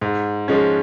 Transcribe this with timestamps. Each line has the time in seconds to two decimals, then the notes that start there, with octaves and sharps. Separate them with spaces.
0.01 G#2
0.48 F3 G#3 C#4